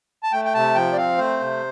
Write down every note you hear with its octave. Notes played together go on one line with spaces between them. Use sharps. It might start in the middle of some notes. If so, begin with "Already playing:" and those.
A5
A3 G5
G5
C3 A5
F3 G5
D5
C4 F5
A3 C5
C3